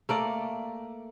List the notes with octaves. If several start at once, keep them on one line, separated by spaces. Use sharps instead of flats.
A3 A#3 D5